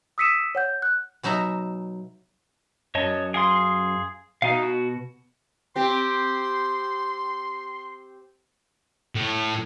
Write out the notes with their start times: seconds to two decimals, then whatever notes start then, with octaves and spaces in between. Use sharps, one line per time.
0.18 D#6 E6 B6 C#7 D#7 E7
0.55 C#5 F#5 G6
0.82 F#6
1.23 B2 F#3 D#4 E5 A#5
2.95 F#2 C#5 D#5 A5
3.34 G#4 F5 C6
4.42 B2 D#4 F5
4.63 F#4
5.76 C4 G4 C6
9.15 A2